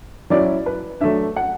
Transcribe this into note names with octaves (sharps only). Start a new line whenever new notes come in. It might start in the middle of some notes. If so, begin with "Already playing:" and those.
F#3 C#4 E4 D5
B4
F#3 A3 D4 E5
F#5